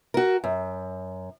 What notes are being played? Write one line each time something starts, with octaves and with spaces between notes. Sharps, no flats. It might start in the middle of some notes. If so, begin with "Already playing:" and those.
F#4 A#4
F#2